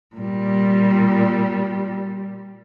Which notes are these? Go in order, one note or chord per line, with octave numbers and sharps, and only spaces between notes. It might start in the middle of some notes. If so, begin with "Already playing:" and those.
A#2 G3